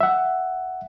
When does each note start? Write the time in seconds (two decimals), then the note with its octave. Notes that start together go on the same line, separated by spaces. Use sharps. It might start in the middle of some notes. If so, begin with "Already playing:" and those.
0.01 E5 F#5